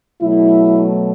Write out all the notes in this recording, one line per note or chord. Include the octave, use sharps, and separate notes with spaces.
B2 F#3 A3 E4